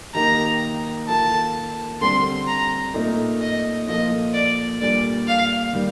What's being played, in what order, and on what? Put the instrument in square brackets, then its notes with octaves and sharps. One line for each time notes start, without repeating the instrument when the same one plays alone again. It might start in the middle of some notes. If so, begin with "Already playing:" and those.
[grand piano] D#3 A#3 D#4 G4 [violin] A#5
[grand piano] D#3 A#3 F4 A4 [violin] A5
[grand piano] D3 G3 C4 [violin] C6
[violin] A#5
[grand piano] A#2 A3 D#4
[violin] D#5
[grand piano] A#2 F3 A#3 F4 A4 [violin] D#5
[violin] D5
[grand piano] A#2 G3 D4 A4 [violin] D5
[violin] F5
[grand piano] D#3 G3